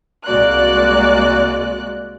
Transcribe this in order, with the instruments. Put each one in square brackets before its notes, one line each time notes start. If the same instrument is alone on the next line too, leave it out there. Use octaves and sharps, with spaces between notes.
[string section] C2 G#3 A#3 F#4 D5 F#6